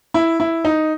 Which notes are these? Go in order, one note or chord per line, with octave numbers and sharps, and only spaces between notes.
E4
E4
D#4